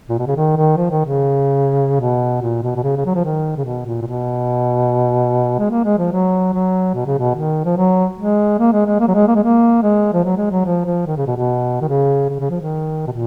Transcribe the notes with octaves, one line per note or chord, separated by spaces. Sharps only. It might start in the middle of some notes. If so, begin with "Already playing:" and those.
A#2
B2
C#3
D#3
D#3
F3
D#3
C#3
B2
A#2
B2
B2
C#3
C#3
F#3
F3
D#3
C#3
B2
A#2
A#2
B2
G#3
A#3
G#3
F3
F#3
F#3
B2
C#3
B2
D#3
F3
F#3
G#3
A#3
G#3
G#3
A#3
F#3
G#3
A#3
G#3
A#3
G#3
F3
F#3
G#3
F#3
F3
F3
D#3
C#3
B2
B2
D#3
C#3
C#3
C#3
F3
D#3
B2
A#2